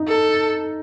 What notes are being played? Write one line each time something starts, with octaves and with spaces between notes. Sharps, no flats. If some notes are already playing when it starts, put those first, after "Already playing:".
Already playing: D#4
A4